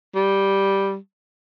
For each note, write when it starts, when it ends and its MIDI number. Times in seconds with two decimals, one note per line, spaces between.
0.15 0.96 55